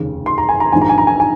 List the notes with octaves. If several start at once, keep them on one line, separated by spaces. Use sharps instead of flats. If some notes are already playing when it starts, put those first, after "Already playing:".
Already playing: F1 D#2 C#3
C6
A#5
G#5
A#5
A#1 G#2 D#3 G#5
A#5
G#5
A#5
G#5
G#5